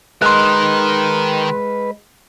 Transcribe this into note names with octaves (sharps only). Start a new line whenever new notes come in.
D#3 G#3 A#4 B4 C6 F#6